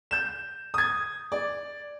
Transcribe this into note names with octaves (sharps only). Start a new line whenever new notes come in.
G6 E7
D#6 G#6
D5